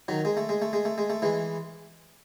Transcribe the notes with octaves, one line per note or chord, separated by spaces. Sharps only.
D#3 F#3
G#3
A3
G#3
A3
G#3
A3
G#3
A3
E3 G#3